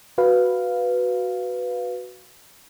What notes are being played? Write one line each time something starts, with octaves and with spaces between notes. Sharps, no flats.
F#4 B4 F5